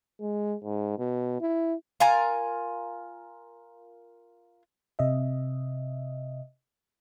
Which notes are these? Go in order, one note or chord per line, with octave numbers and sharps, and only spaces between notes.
G#3
G#2
B2
E4
F4 A#4 G#5 A#5
C3 D#5 E5